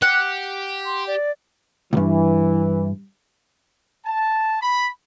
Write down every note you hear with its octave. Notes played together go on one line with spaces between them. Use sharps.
G4 F#5
C6
D5
C#2 G2 E3
A5
B5